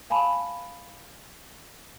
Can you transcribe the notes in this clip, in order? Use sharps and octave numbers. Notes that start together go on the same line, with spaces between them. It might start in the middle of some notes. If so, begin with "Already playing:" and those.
F5 G#5 A5 B5